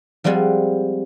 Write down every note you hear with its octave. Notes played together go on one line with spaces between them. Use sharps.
F3 G3 G#3 C4 F#5 G#5